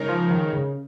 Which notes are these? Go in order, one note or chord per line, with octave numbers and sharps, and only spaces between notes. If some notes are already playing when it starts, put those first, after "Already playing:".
Already playing: C#3 G#3 D#4 A#4 C#5
F3
D#3
C#3